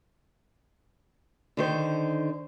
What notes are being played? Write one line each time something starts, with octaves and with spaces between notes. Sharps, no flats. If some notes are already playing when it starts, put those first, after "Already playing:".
D3 D#3 C5